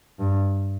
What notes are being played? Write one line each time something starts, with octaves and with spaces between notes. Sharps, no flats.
G2